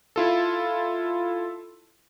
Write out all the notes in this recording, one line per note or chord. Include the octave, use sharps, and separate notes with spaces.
E4 F4 A4